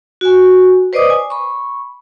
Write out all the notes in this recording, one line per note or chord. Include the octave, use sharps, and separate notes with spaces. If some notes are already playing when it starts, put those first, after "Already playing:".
F#4 G#5
B4 C5 D5 D#5 D6 D#6
G#5
B5 C#6